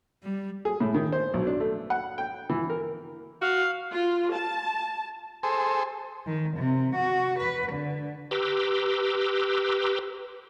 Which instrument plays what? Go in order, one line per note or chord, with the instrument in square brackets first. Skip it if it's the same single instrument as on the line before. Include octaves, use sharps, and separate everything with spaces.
[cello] G3
[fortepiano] G#4
A2
D#3
C5
B1
D4
A3
F#5
G5
E3
A#4
[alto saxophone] F#4 [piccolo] F5
[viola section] F4
A5
[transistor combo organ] G#4 A4 C5
[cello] D#3
C3
F#4
B4
D3
[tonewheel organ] G4 B4 A#5 C6 D6 E6